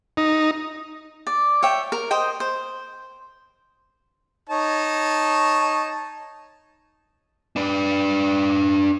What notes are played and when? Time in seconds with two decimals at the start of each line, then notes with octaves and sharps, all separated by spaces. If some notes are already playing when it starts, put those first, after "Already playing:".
0.17 D#4
1.27 D5
1.62 C#5 E5 G5
1.92 A#4
2.11 C5 D#5 G5
2.40 C5
4.50 D#4 C#5 A5
7.56 D4 B4